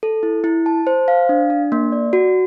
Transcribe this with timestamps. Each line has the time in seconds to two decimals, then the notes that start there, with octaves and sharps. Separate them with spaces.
0.03 A4
0.23 E4
0.44 E4
0.66 A5
0.87 C5
1.08 F5
1.29 D4
1.50 D4
1.72 A#3
1.92 D5
2.13 F#4